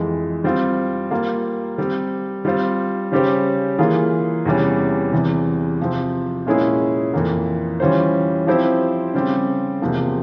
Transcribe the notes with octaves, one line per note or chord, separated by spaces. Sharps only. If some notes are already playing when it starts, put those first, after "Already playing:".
Already playing: F2 E3 G#3
G3 C4 F4
G3 A#3 F4
G3 C4 G4
G3 C4 F4 C5
C#3 G3 C#4 G4 C5
E3 A#3 F4 G#4
E2 C3 E3 G3 C#4
E2 C3 E3
C3 F3 C4
A#2 G#3 C#4 E4 G#4
F2 E3 A#3
E3 G3 C#4 F4 C5
F3 C4 E4 G4 C5
C#3 G3 C4 G4
E2 C3 F3 A#3